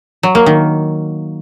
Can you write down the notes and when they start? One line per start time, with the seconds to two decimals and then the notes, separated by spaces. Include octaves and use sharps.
0.23 F#3
0.35 A#3
0.46 D#3